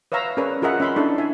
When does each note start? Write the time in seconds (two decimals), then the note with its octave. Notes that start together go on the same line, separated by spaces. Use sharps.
0.12 B4 C#5 E5 F5 A#5 E6
0.37 C#4 G#4 A#4 B4 C#5 D5
0.62 F4 G#4 A#4 D#5 E5 F#5
0.80 C#4 E5 B5 C6
0.96 D4 E4 A4
1.18 E5 G#5